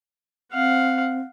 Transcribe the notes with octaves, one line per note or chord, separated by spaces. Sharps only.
C4 F5 F#5